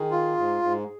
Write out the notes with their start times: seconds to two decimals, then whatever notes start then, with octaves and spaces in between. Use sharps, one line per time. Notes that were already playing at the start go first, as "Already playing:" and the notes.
Already playing: D#3 G#4
0.11 F4
0.37 G#2
0.62 G#2